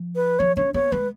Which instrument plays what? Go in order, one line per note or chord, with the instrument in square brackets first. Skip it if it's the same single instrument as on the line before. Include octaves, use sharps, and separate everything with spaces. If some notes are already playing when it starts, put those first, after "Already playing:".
Already playing: [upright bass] F3
[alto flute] B4
[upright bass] F3 [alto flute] C#5
[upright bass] C#4 [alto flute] C#5
[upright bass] B3 [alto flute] C#5
[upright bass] G#3 [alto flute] B4